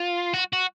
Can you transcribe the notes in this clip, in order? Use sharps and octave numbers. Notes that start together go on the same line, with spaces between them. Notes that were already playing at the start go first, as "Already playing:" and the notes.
Already playing: F4
F#4
F#4